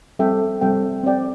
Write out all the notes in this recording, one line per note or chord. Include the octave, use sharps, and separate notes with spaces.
G3 C4 A4 E5 G5
G3 C4 A4 E5 G5
C4 G4 D5 G5